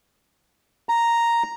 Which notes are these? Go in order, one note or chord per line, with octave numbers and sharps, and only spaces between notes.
A#5